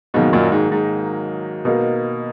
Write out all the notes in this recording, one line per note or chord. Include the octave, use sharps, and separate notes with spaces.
G#2 B2 D#3 F#3 A#3 D#4
F#2 A#2
G#2
G#2
B2 A#3 D#4 A#4